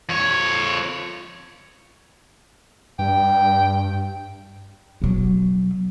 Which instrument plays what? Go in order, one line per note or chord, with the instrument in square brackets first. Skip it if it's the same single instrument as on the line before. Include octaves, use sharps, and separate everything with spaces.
[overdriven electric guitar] F2 C#5
[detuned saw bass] G2 [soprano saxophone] G5
[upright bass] B2 F#3